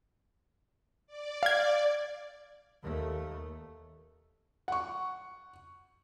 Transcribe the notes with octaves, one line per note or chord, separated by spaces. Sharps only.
D5
F5 G#6
D#2 A3
F#5 C#6